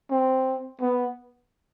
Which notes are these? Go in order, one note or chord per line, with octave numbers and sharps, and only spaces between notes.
C4
B3